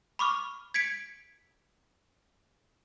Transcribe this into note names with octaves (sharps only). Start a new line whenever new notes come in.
B5 C#6 D6 F6
G#6 B6 C#7 D7